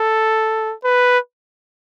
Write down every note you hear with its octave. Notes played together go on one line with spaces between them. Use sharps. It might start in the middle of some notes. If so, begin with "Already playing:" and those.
Already playing: A4
B4